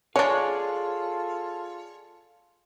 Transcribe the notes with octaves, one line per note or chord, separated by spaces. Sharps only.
G#3 D4 F4 G#4 A4 C#5 D5 F5